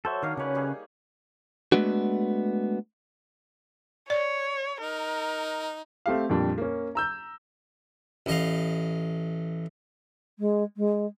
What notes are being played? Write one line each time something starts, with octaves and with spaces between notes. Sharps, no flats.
F#3 A4 C5 E5
D#3 A#3 D4 D#4 F5
C#3 C#4 D#4 B4 C#5
G3 G#4
G#3 A3 B3 D4 F#4
C#5 D5
D#4 A#4
A3 C4 G4 F5
F2 A#2 G3 D4
A#3 C#4
A#5 E6 G6
A1 D#5 F5
G#3
G#3